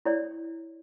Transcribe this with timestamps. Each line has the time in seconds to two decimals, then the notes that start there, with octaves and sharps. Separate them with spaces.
0.05 E4 C#5 D5